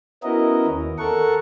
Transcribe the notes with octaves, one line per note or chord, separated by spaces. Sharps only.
B3 C#4 E4 F#4 A#4 D#5
D#2
A4 A#4 F#5 C#6